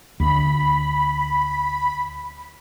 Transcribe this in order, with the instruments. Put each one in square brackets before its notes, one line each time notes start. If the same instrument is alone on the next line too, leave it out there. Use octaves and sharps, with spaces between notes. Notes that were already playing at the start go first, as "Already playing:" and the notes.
[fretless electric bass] D2 [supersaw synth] B5